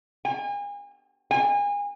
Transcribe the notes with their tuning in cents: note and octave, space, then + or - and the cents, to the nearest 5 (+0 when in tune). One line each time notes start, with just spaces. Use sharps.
G#5 -35
G#5 -30